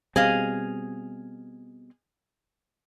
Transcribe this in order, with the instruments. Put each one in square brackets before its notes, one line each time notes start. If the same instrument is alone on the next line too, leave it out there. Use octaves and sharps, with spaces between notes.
[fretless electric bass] B2 G3 C4 [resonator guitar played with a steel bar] G#4 D#5 F5